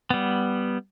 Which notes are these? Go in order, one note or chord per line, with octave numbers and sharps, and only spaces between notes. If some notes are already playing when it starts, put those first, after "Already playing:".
G3 B3